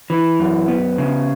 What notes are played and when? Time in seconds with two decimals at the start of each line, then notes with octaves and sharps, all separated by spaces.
0.10 E3
0.39 F#2
0.68 B3
0.98 C#3